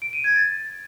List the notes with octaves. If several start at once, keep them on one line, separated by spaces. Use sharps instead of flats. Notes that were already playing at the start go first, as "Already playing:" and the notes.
D7
D#7
G#6
A6